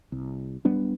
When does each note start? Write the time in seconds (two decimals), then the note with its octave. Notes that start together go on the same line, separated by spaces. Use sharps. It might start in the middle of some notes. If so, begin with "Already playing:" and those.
0.12 C2
0.65 D1 G3 B3 D4